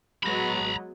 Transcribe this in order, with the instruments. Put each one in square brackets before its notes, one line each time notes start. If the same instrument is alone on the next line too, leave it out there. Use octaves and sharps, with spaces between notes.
[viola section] F#3 G#3 B3 [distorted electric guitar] A#5 B5